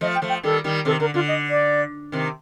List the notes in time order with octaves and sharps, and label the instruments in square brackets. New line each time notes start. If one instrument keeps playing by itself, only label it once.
[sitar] F3 A3 [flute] D#5
[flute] G5
[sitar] F3 A3
[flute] G5
[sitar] D#3 G3 [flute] A4
[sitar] D#3 G3
[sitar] C3 D#3 [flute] A4
[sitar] D3 [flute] A#4
[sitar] D3 [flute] F4
[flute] D#5
D5
[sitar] C3 D#3